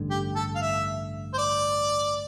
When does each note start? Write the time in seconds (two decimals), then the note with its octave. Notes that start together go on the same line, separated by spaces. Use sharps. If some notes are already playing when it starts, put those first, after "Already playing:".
Already playing: A1 G2 D3
0.11 G4
0.36 A4
0.55 F5
0.62 E5
1.34 C5
1.38 D5